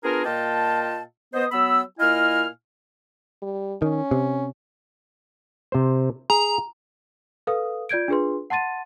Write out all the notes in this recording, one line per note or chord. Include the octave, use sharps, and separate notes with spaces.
B3 D4 F4 G#4 A#4
A#2 F4 D#5 F5 G5 A5
B3 C5 D#5
F#3 B3 B5 E6
A#2 E4 D#5 F5 G#5 F6
G3
D#3 C#4
C3
C3 C5
G#4 A#5
A4 B4 F5 D#6
F4 D5 G6 G#6 D7
D4 F4 G#4 B4 C6
F#5 A5 C6 A6 D#7